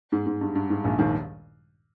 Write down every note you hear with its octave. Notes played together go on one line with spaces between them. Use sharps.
G#2
G#2
G2
G2
G#2
A#1 A#2
D#2 D#3